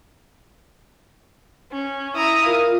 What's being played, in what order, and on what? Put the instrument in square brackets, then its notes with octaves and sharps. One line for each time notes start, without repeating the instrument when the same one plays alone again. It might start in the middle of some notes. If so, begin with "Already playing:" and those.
[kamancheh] C#4
[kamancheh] E4 A#5 [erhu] D#6
[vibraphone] F4 A#4 [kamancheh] F5